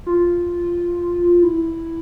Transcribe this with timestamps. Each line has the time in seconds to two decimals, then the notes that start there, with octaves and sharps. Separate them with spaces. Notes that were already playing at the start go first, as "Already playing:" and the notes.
0.06 F4
1.43 E4